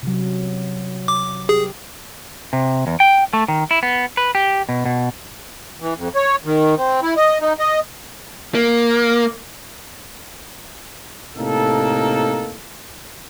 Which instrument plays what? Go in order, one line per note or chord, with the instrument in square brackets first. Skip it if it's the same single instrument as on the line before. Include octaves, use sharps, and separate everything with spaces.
[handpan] C3 F#3
[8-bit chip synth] D6
[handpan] G4 [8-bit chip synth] G#4
[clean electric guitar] C3
E2
G5
A3
D#3
E4
B3
B4
G4
B2
B2
[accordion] E3
F2
C#5
D#3
C4
E4
D#5
D#4
D#5
[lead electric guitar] A#3
[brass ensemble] A2 C3 A#3 D#4 A4